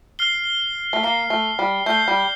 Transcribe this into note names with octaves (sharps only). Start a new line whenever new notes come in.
F6 C7 G7
A3
A#3 F6 C7 G7
A3
G3
A3 G6 C7 G7
G3